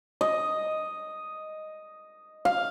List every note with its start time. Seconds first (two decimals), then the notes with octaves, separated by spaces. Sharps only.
0.21 D#5
2.45 F5